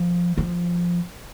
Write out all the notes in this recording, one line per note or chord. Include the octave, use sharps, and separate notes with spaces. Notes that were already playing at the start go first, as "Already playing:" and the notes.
Already playing: F3
F3